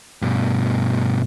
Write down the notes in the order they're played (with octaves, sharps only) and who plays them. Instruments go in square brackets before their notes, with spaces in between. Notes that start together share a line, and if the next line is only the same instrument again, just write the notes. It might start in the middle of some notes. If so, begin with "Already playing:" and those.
[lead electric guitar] G2 B2